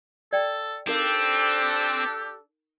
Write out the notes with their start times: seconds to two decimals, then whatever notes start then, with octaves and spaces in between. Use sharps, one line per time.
0.33 A4 D5 G5
0.87 C4 D4 D#4 G4 A4 A#4 F5